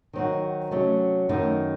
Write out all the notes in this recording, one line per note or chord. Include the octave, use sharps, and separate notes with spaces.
D#3 F#3 C4 D#4 F#4
C3 F#3 A3 C#4
F#2 D#3 A3 D#4